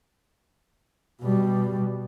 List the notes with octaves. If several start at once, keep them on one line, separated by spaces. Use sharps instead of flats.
B2 G3